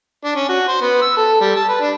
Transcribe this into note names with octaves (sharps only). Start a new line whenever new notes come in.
D4
C#4
F#4
C5
B3
E6
A4
G3
A5
B4
D4